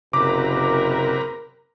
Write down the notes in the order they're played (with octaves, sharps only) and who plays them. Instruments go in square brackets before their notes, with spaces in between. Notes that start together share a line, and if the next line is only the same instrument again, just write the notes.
[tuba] F#1 [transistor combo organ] C3 B4 A#5 [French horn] A#4 [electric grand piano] D6